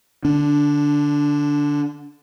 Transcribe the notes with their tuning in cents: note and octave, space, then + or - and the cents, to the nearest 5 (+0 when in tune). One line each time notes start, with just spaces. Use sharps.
D3 +5 D4 -15